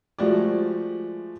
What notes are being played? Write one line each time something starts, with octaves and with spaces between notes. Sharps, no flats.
F3 G#3 A3 F#4 G4 D5